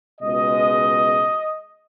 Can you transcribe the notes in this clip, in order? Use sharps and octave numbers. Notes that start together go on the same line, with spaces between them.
C#2 B2 G#3 D#5